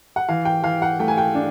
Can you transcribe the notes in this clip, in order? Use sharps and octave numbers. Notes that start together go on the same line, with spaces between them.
F#5
E3 F5
G5
E3 F5
F#5
A3 G5
G#5
G5
D4